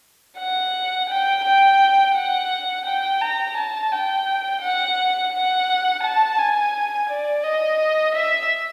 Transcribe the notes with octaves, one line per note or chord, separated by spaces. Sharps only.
F#5
G5
G5
F#5
G5
A#5
A5
G5
F#5
F#5
A5
G#5
D5
D#5
E5